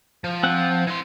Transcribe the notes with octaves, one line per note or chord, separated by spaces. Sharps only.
F3
C4 F#5
E3 C6